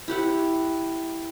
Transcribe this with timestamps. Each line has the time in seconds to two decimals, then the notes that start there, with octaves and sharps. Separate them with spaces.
0.08 E4 G4 F#5